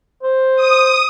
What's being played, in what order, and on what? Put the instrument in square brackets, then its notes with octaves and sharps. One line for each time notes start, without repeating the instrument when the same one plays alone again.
[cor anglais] C5
[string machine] D#6